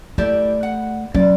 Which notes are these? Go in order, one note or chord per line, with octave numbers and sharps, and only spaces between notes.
A3 E4 G4 D5
F#5
F#3 C#4 D5